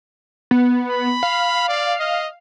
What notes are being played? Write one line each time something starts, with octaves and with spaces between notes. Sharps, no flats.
B3
B5
F5
D5
D#5